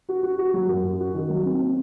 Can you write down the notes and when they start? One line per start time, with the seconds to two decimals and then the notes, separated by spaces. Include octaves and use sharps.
0.09 F#4
0.23 F#4
0.38 F#4
0.54 F#3
0.69 F#2
0.84 F#4
1.00 F#4
1.14 D#3
1.30 F#3
1.45 C4
1.60 C4